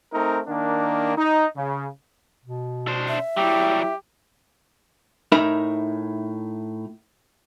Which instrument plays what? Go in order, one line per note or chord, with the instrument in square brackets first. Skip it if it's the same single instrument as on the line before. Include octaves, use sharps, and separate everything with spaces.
[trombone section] A3 C4 D#4 A#4
D#3 A#3 D4
D#4
C#3
[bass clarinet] B2
[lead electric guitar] D4 C5
[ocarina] E5
[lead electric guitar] F#3 G3 [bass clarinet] E4 [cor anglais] G4
[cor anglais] G4
[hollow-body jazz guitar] A2 D#4 A#4 E5 B5